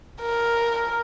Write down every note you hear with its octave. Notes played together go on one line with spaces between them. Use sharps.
A#4